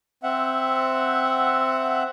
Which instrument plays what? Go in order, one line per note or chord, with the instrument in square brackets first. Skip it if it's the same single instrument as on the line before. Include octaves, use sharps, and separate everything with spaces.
[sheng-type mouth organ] C4 E5 F#5